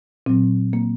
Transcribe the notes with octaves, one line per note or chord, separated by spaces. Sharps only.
A#2 F#3 C4
A#3